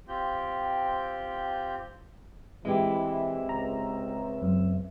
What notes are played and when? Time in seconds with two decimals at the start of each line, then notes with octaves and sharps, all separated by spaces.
0.08 C4 F4 G4 G6
2.65 E3 G#3 C4 E4 G4 E5
3.49 C#2 A#5
4.42 F#2